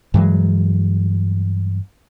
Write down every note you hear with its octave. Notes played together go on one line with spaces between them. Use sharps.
G2 E3 F#3 G#3